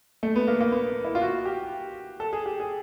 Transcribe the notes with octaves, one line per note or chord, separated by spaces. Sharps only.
A3
B3
A#3
A#3
B3
E4
F4
F#4
G4
A4
G#4
G4
G#4